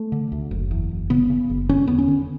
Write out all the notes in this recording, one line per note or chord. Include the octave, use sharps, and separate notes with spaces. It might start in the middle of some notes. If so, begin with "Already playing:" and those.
Already playing: A3
D3
D2
F#1
E2
F#1
C#3 B3
C#3
F#1
D3 C#4
E2 B3
C#4
D3